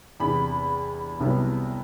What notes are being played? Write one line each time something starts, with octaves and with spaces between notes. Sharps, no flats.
E2 C3 E3 B5
C2 C3 F#3 B3 E4